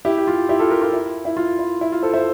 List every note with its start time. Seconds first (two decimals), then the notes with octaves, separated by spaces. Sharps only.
0.05 E4 G4
0.18 G4
0.27 F4
0.49 E4 G4
0.59 F4 A4
0.70 G4 A#4
0.82 F4
0.93 E4
1.25 E4
1.37 F4
1.59 E4
1.81 E4
1.92 F4
2.03 A4 C5
2.13 C5 E5